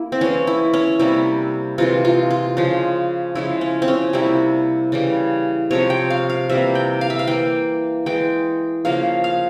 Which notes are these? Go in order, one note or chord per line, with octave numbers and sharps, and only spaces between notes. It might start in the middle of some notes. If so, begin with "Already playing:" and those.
Already playing: A#3 E4
C4
E3 G#3 C#4
E4
C#4
C3 G3 A#3 E4
C3 E3 G#3 F4
F4
F4
C#3 F3 G#3
C#3 F3 G#3 E4
C#4
C4
C#4
C3 G3 A#3 E4
C#3 E3 G3
C3 F3 G#3 C#5
G5
F5
F5
C3 E3 G3 A#3 E5
G5
F5
E5
F5
E3 A#3 G5
E3 G#3 G5
C#3 F3 A#3 F5
F5